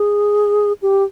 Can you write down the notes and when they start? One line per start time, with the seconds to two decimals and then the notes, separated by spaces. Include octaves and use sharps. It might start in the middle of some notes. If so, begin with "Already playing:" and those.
Already playing: G#4
0.82 G4